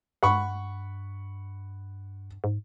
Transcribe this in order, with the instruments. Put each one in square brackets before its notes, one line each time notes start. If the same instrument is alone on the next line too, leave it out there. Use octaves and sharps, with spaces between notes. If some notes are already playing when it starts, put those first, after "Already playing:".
[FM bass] G2 [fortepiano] F#5 B5 C#6
[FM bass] G#2